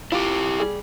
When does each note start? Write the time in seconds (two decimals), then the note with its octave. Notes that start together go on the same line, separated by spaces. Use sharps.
0.12 E4 F4 G4
0.60 G3 G#4